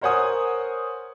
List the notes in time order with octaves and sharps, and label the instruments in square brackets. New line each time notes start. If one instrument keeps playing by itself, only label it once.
[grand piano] A#4 C5 C#5 F#5 G#5 D#6